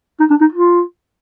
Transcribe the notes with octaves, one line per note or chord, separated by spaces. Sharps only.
D#4
D4
D#4
F4